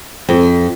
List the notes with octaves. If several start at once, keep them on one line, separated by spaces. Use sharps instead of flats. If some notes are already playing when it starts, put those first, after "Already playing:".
F2